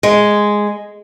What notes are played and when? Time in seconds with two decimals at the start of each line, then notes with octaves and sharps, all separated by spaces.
0.03 G#3